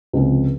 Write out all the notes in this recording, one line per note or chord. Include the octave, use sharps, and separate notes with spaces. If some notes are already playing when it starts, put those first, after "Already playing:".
C#2 C3 F3